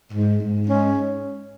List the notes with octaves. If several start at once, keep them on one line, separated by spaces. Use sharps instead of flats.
G#2
G#2
G#3 C#4